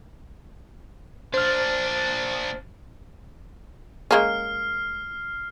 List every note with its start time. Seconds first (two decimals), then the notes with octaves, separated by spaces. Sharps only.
1.34 A#2 D4 C5 F6
4.11 G#3 A#3 C#4 F6 C7